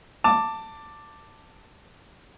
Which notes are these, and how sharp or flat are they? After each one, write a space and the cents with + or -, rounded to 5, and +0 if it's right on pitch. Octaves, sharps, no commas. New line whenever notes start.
A5 +15 D6 +0